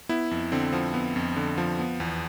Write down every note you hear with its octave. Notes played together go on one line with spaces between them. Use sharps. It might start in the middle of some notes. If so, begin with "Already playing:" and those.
B3 E4
F2
D3 C4
F3
B3
F2
D3
F3
B3
E2